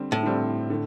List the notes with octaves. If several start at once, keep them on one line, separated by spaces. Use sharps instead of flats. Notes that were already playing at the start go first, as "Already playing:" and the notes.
Already playing: D3 G3 C4
A2
D3 G3 C4
D3 A3